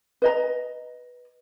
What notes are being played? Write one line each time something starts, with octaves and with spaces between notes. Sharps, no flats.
B4 D#5 A#5